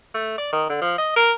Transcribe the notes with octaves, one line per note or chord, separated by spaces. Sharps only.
A3
D5
D#3
D3
F3
D#5
A#4